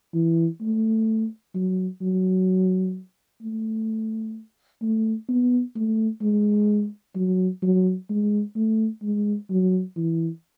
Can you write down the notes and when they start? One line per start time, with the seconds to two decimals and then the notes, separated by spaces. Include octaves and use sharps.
0.14 E3
0.61 A3
1.55 F#3
2.01 F#3
3.42 A3
4.82 A3
5.29 B3
5.76 A3
6.22 G#3
7.16 F#3
7.63 F#3
8.10 G#3
8.56 A3
9.02 G#3
9.50 F#3
9.97 E3